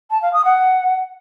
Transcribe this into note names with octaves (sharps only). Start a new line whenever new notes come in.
A5
F5
D#6
F#5